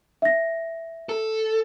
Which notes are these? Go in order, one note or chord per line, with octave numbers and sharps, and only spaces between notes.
E5 A#6
A4